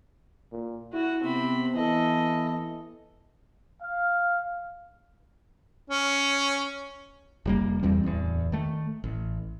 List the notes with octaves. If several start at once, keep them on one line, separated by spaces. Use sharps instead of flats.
A#2
E4 F#4
C3 B3 C4 B5
E3 A4 D#5
F5
C#4
F1 G3 A#3
E2 E3 G3 C4
D1 E2
D#3 A3
A1